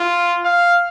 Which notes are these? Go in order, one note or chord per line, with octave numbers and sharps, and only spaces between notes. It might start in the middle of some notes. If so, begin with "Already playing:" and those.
Already playing: F4
F5